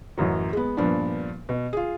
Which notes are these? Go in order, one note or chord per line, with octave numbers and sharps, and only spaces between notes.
A1 F#2 F#3
G#3 B3
G2 A#2 F3 B3 D4
B2
F4 G#4